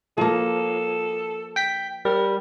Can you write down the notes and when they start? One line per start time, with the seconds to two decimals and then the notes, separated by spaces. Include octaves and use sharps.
0.18 F3 A#3 A4
1.56 G5 B6
2.05 G3 A#4